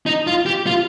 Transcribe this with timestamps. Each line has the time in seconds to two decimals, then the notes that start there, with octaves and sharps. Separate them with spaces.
0.06 D#4
0.27 F4
0.46 G4
0.67 F4